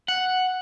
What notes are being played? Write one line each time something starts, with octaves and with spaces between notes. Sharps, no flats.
F#5